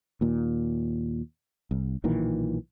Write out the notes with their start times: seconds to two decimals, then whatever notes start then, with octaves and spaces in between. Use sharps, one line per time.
0.21 D#2 A#2
1.71 C2
2.04 B1 A#2 D#3 E3